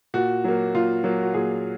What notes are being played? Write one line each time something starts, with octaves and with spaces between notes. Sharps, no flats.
A#2 F#4
F#3 A#3
A#2 F4
F#3 A#3
F#4
A#2 G#4